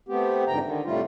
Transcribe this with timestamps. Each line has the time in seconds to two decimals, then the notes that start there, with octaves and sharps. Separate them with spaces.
0.09 A3 B3 C4 G4
0.48 F2 G#2 D3 G5 A#5
0.64 D3 D#3
0.85 A2 C3 G3 A3 F4